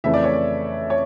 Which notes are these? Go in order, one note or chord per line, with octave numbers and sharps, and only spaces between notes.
F2 C#3 E3 A3 C#4 E5
D5
C#5
D5
C#5